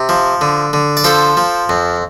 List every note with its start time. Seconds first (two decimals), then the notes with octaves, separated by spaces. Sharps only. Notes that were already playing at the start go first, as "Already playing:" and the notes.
Already playing: C3
0.09 F3
0.41 D3
0.73 D3
0.97 D5
1.04 F3 A4 C5
1.37 F3
1.69 F2